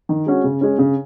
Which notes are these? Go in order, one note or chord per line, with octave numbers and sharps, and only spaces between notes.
D#3
G#3 C#4 F#4
C#3
G#3 C#4
C#3